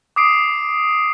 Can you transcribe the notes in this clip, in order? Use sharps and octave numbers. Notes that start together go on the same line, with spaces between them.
D6 D#6 C7 D7